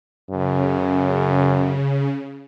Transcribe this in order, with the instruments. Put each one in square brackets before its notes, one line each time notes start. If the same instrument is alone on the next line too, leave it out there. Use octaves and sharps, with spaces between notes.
[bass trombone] F#2 [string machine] C#3